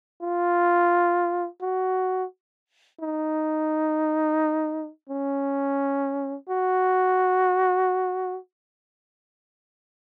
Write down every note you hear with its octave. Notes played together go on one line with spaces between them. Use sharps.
F4
F#4
D#4
C#4
F#4